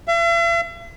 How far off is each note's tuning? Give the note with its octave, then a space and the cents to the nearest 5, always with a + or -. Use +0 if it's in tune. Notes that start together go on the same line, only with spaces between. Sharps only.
E5 +45